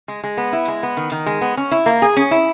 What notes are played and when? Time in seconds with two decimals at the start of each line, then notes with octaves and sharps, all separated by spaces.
0.08 G#3
0.24 G#3
0.37 B3
0.53 E4
0.68 G#3
0.83 B3
0.97 D#3
1.12 D#3
1.26 G#3
1.41 B3
1.57 C#4
1.72 E4
1.86 A#3
2.02 G#4
2.17 C#4
2.31 E4